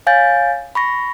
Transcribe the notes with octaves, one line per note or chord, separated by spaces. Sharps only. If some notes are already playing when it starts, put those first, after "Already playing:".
C#5 F5 G#5 G6 A6
B5 C#6 A#6